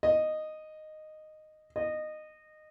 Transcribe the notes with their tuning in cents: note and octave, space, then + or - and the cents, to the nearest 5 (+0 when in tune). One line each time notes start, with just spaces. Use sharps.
D#5 -10
D#5 -20